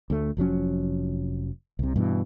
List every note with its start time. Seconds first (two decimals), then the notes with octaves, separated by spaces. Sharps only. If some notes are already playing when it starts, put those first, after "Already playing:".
0.10 D2 A3
0.37 F1 F3 F#3 C#4
1.79 C2 C3
1.96 G2 B2 E3